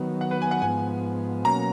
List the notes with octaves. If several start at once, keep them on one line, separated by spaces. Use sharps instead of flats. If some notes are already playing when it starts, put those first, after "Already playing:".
Already playing: D#3 F#3 B3
F#5
B4
G#5
F#5
G#2 F3 B3 G#5
B2 F#3 A#3 C#4 A#5